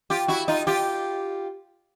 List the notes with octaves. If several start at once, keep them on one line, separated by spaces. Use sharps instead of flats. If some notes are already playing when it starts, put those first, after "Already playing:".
F4 G4
E4 F#4
D#4 F4
F4 G4